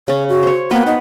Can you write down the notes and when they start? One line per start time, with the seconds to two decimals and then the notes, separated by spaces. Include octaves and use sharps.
0.08 C#3 C#4 C#5
0.29 F#4
0.43 C5 C#5
0.71 A#3 B3 B4 G5
0.87 D#4 F#5